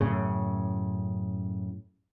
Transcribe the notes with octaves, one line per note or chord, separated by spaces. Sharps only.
F#2 A2 C#3